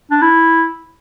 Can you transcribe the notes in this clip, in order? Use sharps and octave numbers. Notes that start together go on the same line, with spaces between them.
D4
E4